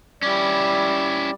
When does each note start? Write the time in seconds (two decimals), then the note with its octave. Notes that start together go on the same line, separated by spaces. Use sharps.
0.23 G3 C#4 E4 D5